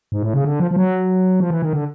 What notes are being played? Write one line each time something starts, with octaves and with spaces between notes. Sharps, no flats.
G#2
A2
C#3
D3
F3
F3
F#3
F3
E3
D#3
D3